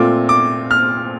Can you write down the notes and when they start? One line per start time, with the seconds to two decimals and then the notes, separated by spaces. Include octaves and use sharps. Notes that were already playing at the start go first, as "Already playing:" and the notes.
Already playing: A#2 A3 C4 F4 D6
0.29 D6
0.71 F6